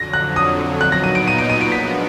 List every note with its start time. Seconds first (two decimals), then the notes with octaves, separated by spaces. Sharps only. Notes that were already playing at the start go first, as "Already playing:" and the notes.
Already playing: F2 D3 F#3 A#6
0.13 F#6
0.36 D#6
0.81 A#2 F#3 B3 D#4 F#6
0.92 A#6
1.04 D#7
1.15 D7
1.28 D#7
1.38 D7
1.50 D#7
1.61 D7
1.72 F3 G#3 B3 D4 F#4 B6